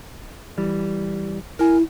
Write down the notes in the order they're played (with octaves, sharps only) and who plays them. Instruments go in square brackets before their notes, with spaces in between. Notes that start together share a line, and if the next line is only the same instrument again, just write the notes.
[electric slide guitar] E3 G3
[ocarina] E4 [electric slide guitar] A#4 G#5